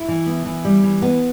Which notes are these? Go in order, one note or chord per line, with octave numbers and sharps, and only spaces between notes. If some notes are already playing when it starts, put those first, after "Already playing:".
Already playing: E4
E3
B3
E3
G3
E3
B3